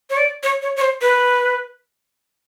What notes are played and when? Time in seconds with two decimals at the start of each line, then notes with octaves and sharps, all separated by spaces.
0.10 C#5
0.17 D5
0.43 C#5
0.62 C#5
0.76 C#5
0.81 C5
1.01 B4